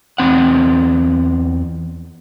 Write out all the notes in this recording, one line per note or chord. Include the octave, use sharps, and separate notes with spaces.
E2 C4 F#5